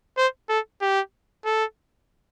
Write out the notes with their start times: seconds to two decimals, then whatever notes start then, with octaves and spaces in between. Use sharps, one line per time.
0.17 C5
0.49 A4
0.81 G4
1.45 A4